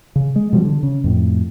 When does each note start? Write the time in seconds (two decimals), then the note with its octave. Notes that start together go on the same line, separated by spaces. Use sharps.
0.16 C#3
0.36 G#3
0.53 B2 F3 G3
0.65 D3
0.83 C#3
1.04 F2 A2